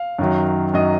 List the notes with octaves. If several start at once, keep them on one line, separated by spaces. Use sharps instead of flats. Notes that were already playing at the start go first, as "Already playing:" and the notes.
Already playing: F5
F#2 D#3 F#3
F#2 D#3 F#3 D#5